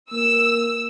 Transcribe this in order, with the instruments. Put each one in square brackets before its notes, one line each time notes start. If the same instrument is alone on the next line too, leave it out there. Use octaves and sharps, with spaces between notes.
[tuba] A#3 [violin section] E6